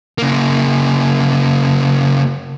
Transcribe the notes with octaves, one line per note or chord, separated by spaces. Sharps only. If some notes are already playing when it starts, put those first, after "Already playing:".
C#3 A#3